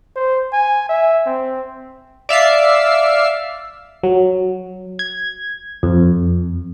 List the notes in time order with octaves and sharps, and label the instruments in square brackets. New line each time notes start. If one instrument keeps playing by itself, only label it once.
[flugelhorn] C5
G#5
E5
C4
[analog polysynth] D5 E5 F5 C7
[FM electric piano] F#3
G#6
F2